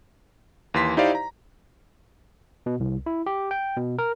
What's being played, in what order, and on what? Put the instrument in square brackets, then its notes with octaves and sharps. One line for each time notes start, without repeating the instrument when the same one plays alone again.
[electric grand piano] D#2 E3 C6 B6
D#4 E4 G4 C5 D5 F5
A#5
[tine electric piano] B2
C2
E4
G4
G5
B2
A#4